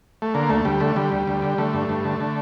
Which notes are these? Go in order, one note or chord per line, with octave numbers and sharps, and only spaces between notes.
A3
D3 A#3
D2 A3
D2 G3
D3 A3
D3 G3
D2
D2
D3
D3 A3
G2
G2
D3
D3